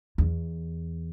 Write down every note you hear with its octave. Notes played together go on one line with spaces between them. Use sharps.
E2